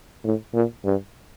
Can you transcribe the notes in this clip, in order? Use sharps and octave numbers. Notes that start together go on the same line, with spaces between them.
A2
A#2
G2